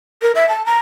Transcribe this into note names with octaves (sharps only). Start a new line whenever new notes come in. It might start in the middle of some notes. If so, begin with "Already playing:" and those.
A#4
E5
A5
A#5